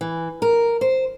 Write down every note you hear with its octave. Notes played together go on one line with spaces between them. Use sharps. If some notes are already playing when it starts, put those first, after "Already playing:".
E3
A#4
C5